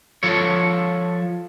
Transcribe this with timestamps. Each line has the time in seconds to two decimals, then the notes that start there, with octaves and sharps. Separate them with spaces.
0.23 F3 A4 C#5